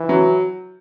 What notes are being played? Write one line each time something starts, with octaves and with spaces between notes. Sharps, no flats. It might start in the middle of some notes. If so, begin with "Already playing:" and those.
Already playing: E3
F#3